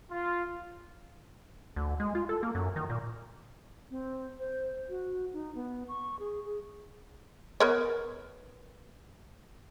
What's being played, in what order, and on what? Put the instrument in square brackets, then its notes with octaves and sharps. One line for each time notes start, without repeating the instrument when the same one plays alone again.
[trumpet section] F4
[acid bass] D2
G#3
F4
A4
A#3
F#2
D#3
A#2
[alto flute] C4
C5
F#4
D#4
B3
C#6
G#4
G#4
[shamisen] B3 A#4 C#5